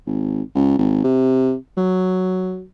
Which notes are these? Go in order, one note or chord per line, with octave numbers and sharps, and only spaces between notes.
G#1
C#2
G#1
C3
F#3